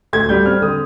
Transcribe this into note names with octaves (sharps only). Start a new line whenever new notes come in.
D2 G#6
G3 G6
C4 F6
D3 D#6